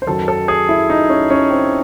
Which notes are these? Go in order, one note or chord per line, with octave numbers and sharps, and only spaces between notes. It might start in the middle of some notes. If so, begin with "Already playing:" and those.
C5
F#2 D#3 F#3 A4
A4
G#4
E4
D#4
C#4
C#4
C4